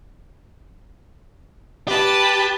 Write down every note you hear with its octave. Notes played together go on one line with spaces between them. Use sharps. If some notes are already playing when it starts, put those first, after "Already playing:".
G4 B4 A5